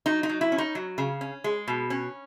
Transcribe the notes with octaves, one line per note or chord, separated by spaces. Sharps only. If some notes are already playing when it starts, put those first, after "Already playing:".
F#3 D#4
D#4
F#3
E4
C#4
D#4
F#3
C#3
C#4
G#3
B2
C#4